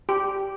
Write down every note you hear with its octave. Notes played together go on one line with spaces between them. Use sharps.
G4